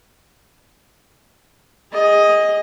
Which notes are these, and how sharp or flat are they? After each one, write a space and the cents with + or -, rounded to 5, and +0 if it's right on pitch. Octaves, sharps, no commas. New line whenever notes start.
G#4 -30 D#5 +5